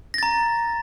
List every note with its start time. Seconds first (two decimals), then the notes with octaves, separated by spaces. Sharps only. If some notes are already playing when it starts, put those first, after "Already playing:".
0.14 A#6
0.18 A6
0.23 A#5